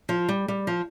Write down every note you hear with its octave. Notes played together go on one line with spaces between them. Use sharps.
F3
G3
G3
F3